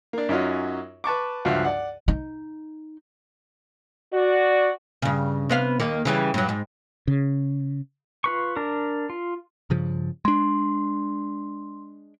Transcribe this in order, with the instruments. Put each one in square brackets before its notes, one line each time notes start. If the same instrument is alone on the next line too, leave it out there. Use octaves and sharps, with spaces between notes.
[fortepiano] A#3 D4
F#2 C#4 D#4 F4 F#4
B4 A5 C#6 D6
C#2 G2 F3 F#4 E5 F5
D5 F#5
[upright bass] D#4
[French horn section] F#4 D5
[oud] G2 C#3
C3 B3 F5
D#2 D#3 A#3
C#3 E3 G3
G2 F#3
G#2
[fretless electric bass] C#3
[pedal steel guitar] F4 B4 C#6
D4 A#4
F4
[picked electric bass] G2 C#3 F3
[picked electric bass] G#3 D4 [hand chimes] C6